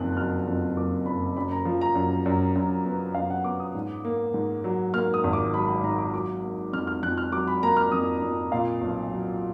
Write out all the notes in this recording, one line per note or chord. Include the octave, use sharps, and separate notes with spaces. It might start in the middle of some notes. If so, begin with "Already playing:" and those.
Already playing: F#1 F2 D#3 F#6
F#3 F6
F2
F#1 D6
F#1 B5
F#2 B5
A#5
F3
A#5
F#2
F#2
F#2
B3
F#2 F5
F#5
B3 D6
D#6
G#2
A#3
G#2
F#3
A#3 F6
D#6
G#1
D6
F#3 B5
B5
G#2 A#5
D6
F#3 D6
A#3
F2 F6
F6
F2 F#6
F6
F#3 D6
B5
A#3 A#5
F6
F2 D#6
F2
A#2 F5
B1
F#3